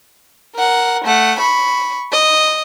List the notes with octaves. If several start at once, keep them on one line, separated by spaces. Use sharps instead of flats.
A#4 F#5
A3 F#5
B5 C#6
D#5